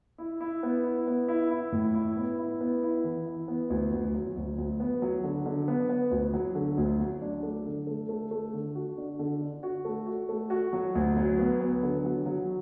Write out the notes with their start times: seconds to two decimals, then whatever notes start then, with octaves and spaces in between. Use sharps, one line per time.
0.18 E4
0.40 E4
0.63 B3
0.84 E4
1.07 B3
1.28 E4
1.50 E4
1.72 A2
1.94 E4
2.17 B3
2.38 E4
2.61 B3
2.83 E4
3.04 E3
3.26 E4
3.48 B3
3.70 D2
3.92 D2
4.14 F#3
4.36 D2
4.58 D2
4.80 B3
5.02 F#3
5.23 D3
5.45 D3
5.68 B3
5.89 B3
6.11 D2
6.34 F#3
6.55 D3
6.78 D2
7.00 F#3
7.22 D4
7.43 A3
7.66 D3
7.87 A3
8.09 A3
8.31 A3
8.53 D3
8.75 F#4
8.98 D4
9.19 D3
9.41 D4
9.63 F#4
9.85 A3
10.06 F#4
10.29 A3
10.50 F#4
10.73 F#3
10.95 D2
11.17 F#3
11.39 B3
11.61 B3
11.83 D3
12.04 F#3
12.26 F#3